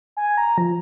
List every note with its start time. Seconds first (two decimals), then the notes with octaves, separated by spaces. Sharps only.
0.17 G#5
0.37 A#5
0.58 F3